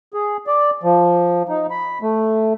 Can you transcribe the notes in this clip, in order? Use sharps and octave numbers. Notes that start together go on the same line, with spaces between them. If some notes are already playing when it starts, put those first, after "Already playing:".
G#4
D5
F3
D#4
B5
A3